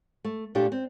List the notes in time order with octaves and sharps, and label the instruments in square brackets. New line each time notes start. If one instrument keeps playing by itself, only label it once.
[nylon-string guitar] A3
A#2 A3 D4 G4
C4